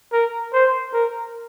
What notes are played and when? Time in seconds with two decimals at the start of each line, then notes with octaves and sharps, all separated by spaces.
0.13 A#4
0.53 C5
0.93 A#4